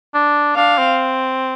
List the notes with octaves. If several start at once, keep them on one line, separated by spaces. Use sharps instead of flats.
D4
D4 F5
C4